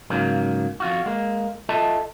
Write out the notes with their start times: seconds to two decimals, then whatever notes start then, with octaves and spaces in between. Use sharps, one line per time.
0.10 G#2 C#3 F#3 A#3
0.80 F2 F4 F#4
1.06 G#3 A#3
1.69 F4 A4 D#5 E5 A5